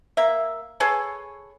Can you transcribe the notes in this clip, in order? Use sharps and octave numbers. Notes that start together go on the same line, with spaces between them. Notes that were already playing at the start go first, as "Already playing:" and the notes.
A#3 E5
G#4 A4 B4 C#5